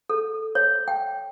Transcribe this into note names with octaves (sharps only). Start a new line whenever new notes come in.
A4
C#5
G5